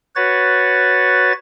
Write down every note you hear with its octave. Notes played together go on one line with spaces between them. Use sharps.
F#4 B4 C#5 A6